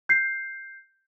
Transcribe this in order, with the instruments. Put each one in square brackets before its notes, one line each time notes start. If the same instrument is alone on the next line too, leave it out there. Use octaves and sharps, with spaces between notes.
[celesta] G6 C7